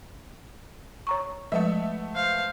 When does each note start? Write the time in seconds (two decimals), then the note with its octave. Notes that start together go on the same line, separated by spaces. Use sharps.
1.07 C#5 A#5 C#6
1.52 F3 G#3 A3 B3 D#5 E5
2.14 C5 F5